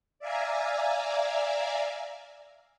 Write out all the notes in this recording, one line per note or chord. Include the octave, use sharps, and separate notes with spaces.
D5 E5 F5 G#5 A#5